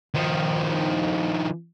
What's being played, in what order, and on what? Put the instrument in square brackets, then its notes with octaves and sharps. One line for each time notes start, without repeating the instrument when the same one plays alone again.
[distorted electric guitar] D#3 F3